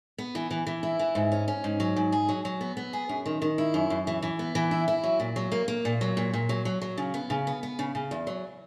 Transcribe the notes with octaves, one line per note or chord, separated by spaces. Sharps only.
B3
E3
E3
E3
E4
E3
G#2
C#4
C#4
G#2
F#3
G#2
G#4
F#3
F#3
B3
B3
G#4
F#2
D#3
D#3
E4
F#2
F#2
E3
E3
B3
E3
E4
E4
F#3
A#2
F#3
A#3
A#3
A#2
F#3
A#2
A#2
F#3
F#3
F#3
C#3
B3
C#3
B3
B3
C#3
C#3
E2
F#3